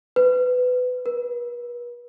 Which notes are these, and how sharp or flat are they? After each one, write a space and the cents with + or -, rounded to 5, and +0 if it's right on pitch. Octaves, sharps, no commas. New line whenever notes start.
B4 +20
B4 -40